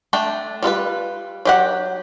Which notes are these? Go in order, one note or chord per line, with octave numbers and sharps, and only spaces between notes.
A3 D4 G5
G3 F4 A4 B4
F#3 G4 F#5